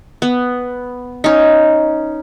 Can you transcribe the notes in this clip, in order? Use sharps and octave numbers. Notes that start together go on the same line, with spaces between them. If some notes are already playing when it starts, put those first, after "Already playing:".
B3
C#4 D#4